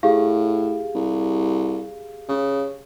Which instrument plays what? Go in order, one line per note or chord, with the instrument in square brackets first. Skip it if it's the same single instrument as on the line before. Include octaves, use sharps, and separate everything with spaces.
[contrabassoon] A2 [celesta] G4 G#4 F5
[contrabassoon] C2
C#3